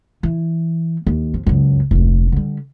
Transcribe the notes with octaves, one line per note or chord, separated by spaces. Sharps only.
E3
D#2
F2
C#2 F#2
F1 D2
D3 G3